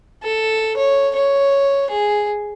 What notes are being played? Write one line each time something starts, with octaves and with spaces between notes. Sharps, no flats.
A4
C#5
C#5
G#4